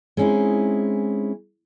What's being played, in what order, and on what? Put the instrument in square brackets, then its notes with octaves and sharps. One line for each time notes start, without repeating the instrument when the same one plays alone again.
[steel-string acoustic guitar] G#3 C4 C#4 D#4 E4